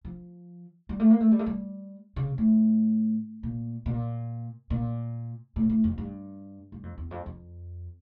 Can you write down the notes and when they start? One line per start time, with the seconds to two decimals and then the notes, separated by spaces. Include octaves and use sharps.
0.05 F3
0.89 G3
1.00 A3
1.10 A#3
1.20 A3
1.31 G3
1.39 A3
1.46 G3
2.16 C#3
2.38 A2
3.43 A#2
3.86 A#2
4.70 A#2
5.56 A2
5.70 A2
5.84 F2
5.98 G2
6.72 G2
6.83 F2
6.98 E2
7.11 F2
7.26 F2